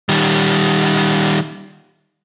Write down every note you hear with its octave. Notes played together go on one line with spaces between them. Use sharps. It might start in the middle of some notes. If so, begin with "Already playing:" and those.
D#3 G3